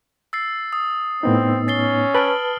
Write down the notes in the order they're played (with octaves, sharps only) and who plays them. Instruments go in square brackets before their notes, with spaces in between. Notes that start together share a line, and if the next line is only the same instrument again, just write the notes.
[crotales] E6 A6 C7
D#6
[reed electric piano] A2 B3 D#4 [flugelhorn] C4
[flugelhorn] C#4 [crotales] A6 C7 G7
[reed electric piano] B4 A5 [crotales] F6 D7 F#7